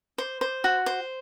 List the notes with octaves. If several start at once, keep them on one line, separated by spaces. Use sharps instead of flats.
C5
C5
F#4
C5